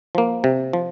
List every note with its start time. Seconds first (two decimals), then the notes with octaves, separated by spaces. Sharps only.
0.15 F3 A#3
0.44 C3
0.73 F3